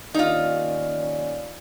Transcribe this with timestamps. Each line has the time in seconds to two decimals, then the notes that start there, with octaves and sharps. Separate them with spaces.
0.14 D#2 C#4 D#4 F4 D5